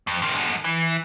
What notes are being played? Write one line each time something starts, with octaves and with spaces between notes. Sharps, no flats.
F2
C3 D#3
F#2 D3
E3